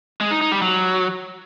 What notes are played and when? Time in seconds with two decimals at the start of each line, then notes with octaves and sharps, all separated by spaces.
0.21 G#3
0.31 D#4
0.41 D#4
0.52 G3
0.62 F#3